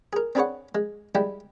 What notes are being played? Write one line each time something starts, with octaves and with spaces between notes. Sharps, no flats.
G#4 A#4
C4 D4 G#4 B4 C#5 F#5
G#3
G3 G#3 E4 G4